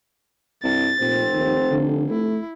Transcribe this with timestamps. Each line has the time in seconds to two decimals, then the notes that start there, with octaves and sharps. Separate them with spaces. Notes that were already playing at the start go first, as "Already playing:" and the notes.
0.64 C2 G2 A6
1.00 F1 A#2 C4
1.33 D#2
1.70 D3
2.10 A3 E4